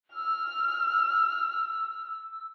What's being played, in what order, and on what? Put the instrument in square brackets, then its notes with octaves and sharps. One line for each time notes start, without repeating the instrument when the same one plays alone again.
[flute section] E6 [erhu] F6